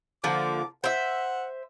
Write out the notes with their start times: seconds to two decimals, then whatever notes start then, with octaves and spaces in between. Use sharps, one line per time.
0.24 D3 F3 A#3 D6
0.84 C5 E5 F#5